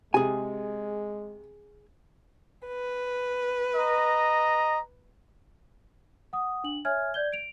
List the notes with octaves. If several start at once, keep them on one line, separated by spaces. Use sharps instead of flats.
C3 G#3 G#4 G#5
B4
D#5 A#5
F#5 D#6
D4 F#7
C#5 E5 G#5 F6 G#6
D5 G6 G#6 G7
D7 F7